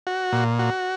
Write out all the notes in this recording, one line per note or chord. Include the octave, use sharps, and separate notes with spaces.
F#4
A#2
F#4